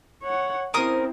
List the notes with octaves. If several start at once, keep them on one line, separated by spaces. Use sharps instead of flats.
C#5 F#5
C4 C#4 E4 A#4 C5 D#6